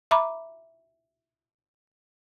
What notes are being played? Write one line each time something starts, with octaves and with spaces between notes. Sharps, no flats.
E5 A#5 B5 D6